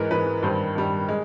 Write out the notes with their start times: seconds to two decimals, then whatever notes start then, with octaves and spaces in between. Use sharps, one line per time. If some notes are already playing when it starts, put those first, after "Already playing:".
Already playing: G#2 E3 G#3 A#4 B4
0.11 G#2 E3 G#3 B4
0.43 G2 D#3 G3 C5
0.75 G2 D#3 G3
1.09 G#3